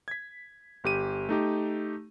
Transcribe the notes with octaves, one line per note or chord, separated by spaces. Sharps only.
G#6 B6
G1 G4 D#7
A3 D#4 G4